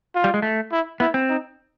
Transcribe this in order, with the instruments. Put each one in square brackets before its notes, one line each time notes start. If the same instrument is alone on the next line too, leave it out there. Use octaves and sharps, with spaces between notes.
[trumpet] F4
[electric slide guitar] G3
G#3
A3
[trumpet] E4
[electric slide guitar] B3 [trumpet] E4
[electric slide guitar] C4
[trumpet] D#4